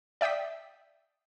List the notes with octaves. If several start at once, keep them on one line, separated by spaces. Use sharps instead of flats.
D5 E5 G5 D#6 B6